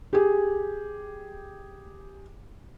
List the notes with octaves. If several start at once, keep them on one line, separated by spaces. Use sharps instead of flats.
G4 G#4